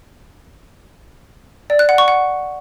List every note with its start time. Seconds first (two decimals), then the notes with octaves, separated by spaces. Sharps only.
1.70 D5
1.79 F#6
1.89 F#5
1.98 C#6
2.08 F#5